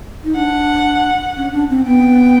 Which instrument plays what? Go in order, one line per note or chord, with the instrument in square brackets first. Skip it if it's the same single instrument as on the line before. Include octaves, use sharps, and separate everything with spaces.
[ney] D#4
[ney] D4 [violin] F#5
[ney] C#4
D4
C4
[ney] B3 [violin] G5